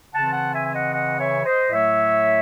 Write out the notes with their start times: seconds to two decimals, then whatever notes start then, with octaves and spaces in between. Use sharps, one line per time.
0.13 C#3 E3 C4 F#5 A5
0.33 F#5 A5
0.54 E5 G#5
0.64 G#5
0.73 D#5 F#5
0.93 D#5 F#5
1.18 C#5 E5
1.45 C5 D#5
1.71 A2 F#3 A3 C#5 E5